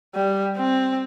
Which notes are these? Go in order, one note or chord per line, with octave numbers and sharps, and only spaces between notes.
G3
C4